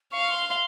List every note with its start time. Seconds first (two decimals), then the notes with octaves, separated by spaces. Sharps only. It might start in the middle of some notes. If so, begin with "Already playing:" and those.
0.12 F5 C#6
0.31 C6
0.49 C6